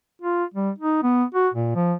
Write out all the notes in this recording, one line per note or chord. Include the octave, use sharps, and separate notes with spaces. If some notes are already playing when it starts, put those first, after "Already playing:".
F4
G3
D#4
B3
F#4
A#2
F3